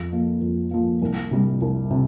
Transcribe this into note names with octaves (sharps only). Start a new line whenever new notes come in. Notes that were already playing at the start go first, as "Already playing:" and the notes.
Already playing: F2
F3 A#3
F2
F3 A#3
C2
C3 G3
C2
C3